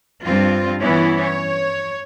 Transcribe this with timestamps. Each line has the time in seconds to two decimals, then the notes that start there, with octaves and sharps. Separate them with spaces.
0.24 G2 C4 F4
0.80 E3 B3 C#4 E4
1.21 C#5